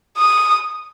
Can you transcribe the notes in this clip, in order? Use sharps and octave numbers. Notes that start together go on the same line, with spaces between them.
D#6